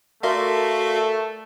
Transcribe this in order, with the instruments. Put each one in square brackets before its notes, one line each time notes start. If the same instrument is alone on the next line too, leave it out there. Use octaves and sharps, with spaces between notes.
[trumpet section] A3 [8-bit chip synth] F#4 E5 F5 [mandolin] A#4 D5 C6